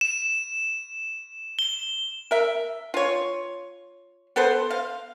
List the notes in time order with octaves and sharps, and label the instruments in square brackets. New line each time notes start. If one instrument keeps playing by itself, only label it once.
[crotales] E7
G7
[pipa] A#4 E5
F4 C#5
B3 A4 B4 C5
F5